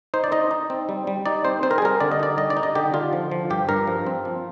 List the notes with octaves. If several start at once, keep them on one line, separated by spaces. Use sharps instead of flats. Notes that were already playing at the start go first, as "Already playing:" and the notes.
D#4 C5
D5
D#4 D#5
D#4
C4
G3
G3
D#4 D5
C4 C5
C4 C5
A#4
G#4
G3 A#4
D3 D5
D#5
D#4 D5
G3 D#5
D5
D#4
D#5
D3 G4
D3 F4
F3
F3
G2 G4
G2 A#4
F3
C4
F3